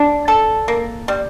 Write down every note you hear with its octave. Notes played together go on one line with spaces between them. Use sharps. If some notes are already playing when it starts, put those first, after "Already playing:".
Already playing: D4
A4
A#3
G3